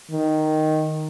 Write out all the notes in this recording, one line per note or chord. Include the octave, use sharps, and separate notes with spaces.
D#3